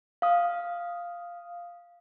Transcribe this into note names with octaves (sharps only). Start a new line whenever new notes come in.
F5 D#6